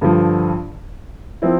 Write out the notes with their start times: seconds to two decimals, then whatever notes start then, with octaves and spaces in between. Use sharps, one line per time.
0.01 G2 D3 F3
1.42 F3 C4 E4